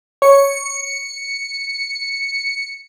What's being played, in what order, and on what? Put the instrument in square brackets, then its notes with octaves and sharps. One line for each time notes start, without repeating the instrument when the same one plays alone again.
[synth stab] C#5 [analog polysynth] C#7